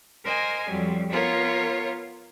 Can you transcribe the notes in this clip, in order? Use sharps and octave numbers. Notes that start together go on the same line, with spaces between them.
A#4 C5 D#5 G#5
F2 F#3 G3
B3 F4 A#4 C#5